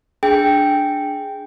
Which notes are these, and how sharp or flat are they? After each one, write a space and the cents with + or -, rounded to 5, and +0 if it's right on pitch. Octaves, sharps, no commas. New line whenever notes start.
D4 +0 G#4 +0 G5 +0